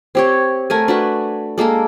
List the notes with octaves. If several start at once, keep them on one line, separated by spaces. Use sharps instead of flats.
C4 G4 C#5
A3 A#4 G#5
D4 F#4 B4
G#3 A#3 A4 A#4